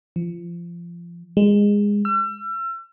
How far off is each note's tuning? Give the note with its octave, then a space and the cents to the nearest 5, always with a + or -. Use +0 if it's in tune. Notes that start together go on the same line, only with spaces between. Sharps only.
F3 -25
G#3 -20
E6 +40